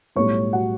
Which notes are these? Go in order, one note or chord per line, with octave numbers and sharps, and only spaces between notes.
B1 A2 G3 C#5 C#6
F#4 F#5